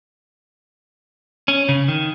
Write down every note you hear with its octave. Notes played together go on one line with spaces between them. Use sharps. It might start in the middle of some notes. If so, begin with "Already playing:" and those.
C#4
C#3
D#3